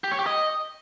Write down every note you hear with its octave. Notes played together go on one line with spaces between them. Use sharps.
G4
C#5
G4
D#5